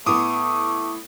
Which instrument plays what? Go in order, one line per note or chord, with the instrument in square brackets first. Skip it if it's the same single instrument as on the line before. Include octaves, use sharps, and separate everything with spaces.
[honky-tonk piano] A2 B3 [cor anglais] A3 [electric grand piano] D6 D#6